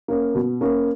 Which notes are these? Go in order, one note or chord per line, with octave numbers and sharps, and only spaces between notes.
A#3 C#4
B2
A#3 C#4